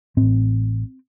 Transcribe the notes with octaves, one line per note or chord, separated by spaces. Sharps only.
A1 A2 C4